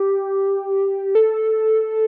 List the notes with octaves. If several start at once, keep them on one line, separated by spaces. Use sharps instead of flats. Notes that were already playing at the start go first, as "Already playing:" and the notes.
Already playing: G4
A4